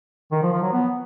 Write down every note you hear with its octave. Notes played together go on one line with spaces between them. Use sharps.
D#3
F3
F3
F#3
B3